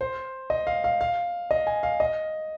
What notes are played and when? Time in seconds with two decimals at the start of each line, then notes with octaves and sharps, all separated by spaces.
0.01 C5
0.50 D#5
0.67 F5
0.84 F5
1.01 F5
1.51 D#5
1.67 G#5
1.83 F5
2.00 D#5